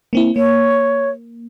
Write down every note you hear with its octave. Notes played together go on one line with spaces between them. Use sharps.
A#3 C4 E4
A#3 C#5